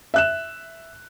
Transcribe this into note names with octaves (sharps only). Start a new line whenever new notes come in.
E5 F#6 E7